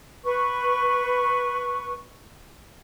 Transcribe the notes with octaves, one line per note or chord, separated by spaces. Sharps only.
B4 C#6